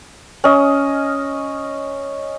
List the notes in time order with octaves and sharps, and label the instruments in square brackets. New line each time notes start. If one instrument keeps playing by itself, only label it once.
[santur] C#4 D#5